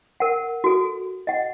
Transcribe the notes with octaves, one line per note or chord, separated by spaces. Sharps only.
A#4 F#5
F#4 A4
D#5 F#5